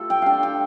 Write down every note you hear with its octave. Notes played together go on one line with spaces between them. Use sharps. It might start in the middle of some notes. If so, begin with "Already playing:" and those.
Already playing: A3 F4 A4
G5
D4 F5 G5
G5